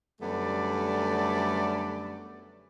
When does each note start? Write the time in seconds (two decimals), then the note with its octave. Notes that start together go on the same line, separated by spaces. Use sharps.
0.21 F#2 D3 G3 A3 B3 D5